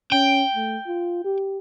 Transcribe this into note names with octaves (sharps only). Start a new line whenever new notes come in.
C#4 G5
A3
F4
G4